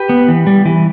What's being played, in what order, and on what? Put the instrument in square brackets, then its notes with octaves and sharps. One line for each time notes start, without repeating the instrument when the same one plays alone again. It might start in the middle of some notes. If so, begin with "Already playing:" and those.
Already playing: [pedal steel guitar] G4 B4
B3
E3
G3
E3